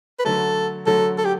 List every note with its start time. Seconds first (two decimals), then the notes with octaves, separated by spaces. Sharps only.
0.19 B4
0.25 D3 F#3 A3 A4
0.86 D3 F#3 A3 A4
1.18 A4
1.25 G4